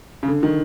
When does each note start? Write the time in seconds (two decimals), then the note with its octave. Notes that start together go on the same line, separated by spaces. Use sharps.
0.23 C#3
0.28 D3
0.43 D#3